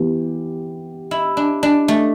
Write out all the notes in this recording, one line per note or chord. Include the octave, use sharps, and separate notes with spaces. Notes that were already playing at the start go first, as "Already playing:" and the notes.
Already playing: E3 B3 G4
E4
D4
D4
A3